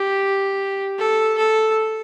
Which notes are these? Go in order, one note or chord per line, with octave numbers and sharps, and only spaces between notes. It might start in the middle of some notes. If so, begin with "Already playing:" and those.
Already playing: G4
A4
A4